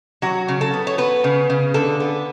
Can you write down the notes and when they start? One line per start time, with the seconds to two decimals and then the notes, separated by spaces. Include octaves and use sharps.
0.22 F#3 F#4
0.48 C#3
0.61 A4
0.73 B3
0.87 C#5
0.98 B3 B4
1.24 C#3
1.50 C#3
1.74 D3 A4
2.00 B3